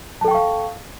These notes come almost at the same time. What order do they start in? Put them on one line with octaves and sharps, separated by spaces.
A5 A4 G5 C#6 F5